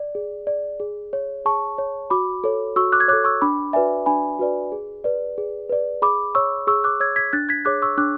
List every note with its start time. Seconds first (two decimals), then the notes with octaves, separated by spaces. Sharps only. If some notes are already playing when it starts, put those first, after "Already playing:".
Already playing: D5
0.15 G#4
0.47 D5
0.80 G#4
1.13 C#5
1.45 G#4 A5 C#6
1.78 C#5
2.10 F#4 B5 D6
2.44 A4 C#5
2.76 F#4 C#6 E6
2.92 D6 F#6
3.00 G#6
3.08 C#5 D6 F#6
3.13 A4
3.24 C#6 E6
3.41 D4 B5 D6
3.73 F#4 B4 D5 E5 G#5
4.06 D4 G#5 B5
4.39 F#4 B4 D5
4.72 G#4
5.04 B4 D5
5.38 G#4
5.69 B4 D5
6.02 G#4 B5 D6
6.35 C#5 C#6 E6
6.67 G#4 C#6 E6
6.84 D6 F#6
7.00 C#5 E6 G#6
7.16 G#6 B6
7.33 D4 F#6 A6
7.49 G#6 B6
7.65 G#4 C#5 D6 F#6
7.82 C#6 E6
7.98 D4 D6 F#6